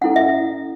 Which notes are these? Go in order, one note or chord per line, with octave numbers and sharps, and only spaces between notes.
C#4 E4 A4 F#5
E5